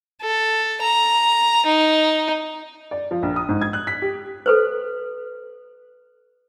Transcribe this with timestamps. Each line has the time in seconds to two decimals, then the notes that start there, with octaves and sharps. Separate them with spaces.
0.21 A4
0.82 A#5
1.66 D#4
2.91 D5
3.11 F3
3.23 A#1
3.36 D#6
3.49 G#2
3.61 G#6
3.73 F#6
3.87 B6
4.02 G4
4.46 A4 B4 C5